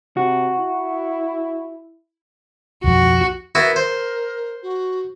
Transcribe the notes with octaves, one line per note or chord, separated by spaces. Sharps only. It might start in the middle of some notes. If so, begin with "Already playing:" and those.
C3 F#4
E4
B1 F2 F3 F#4
B3 E4 F#4 A#4
C5
F#4